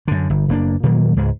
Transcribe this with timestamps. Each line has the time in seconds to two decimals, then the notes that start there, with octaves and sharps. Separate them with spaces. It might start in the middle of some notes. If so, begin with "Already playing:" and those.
0.08 F#2 D3
0.30 G1
0.49 F#1 A#3 D4
0.83 A#2 D#3 F#3 A#3
1.16 C#2 G#2 G#3